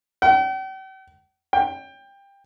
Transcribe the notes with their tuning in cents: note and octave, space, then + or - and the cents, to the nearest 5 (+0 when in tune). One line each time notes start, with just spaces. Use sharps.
G5 -45
G5 +20